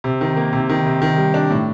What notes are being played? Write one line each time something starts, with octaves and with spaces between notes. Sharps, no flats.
C3
D#3
A#3
C3
D#3
C3
D#3
G3
D4
A2